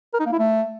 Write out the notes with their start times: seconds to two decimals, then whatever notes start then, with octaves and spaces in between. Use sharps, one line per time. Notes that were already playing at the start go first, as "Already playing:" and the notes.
0.14 A#4
0.20 D#4
0.26 A#3
0.33 E4
0.39 A3